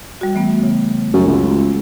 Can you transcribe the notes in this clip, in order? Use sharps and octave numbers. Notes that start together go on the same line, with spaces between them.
G3 F#4
E3 A3 B3
C#3
F#2
C#2